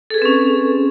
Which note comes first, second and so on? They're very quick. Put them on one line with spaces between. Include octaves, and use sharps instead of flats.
A4 G#4 B4 C4 C#4